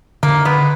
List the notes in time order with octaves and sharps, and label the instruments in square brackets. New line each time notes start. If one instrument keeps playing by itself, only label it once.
[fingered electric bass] D3 [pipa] A#3
[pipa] G#3 B3